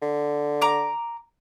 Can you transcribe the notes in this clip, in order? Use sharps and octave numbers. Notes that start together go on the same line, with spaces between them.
D3
A#5 D6